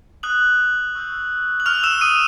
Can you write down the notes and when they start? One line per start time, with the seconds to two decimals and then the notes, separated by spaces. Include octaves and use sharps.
0.23 D#6 F#6 F#7
0.95 C#6 E6 G6
1.60 F#7
1.66 C#6 E6 F6 G6 F7
1.83 E6 E7
2.01 D#6 D#7